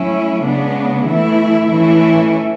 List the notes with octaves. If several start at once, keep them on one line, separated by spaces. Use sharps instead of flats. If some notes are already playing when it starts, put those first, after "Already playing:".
Already playing: F#3 A3 C#4 E4
C#3 G#3 B3 D4
E3 A3 E4
E3 A3 C#4 E4